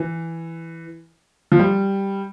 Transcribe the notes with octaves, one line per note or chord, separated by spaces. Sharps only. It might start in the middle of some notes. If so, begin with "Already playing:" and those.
Already playing: E3
F3
G3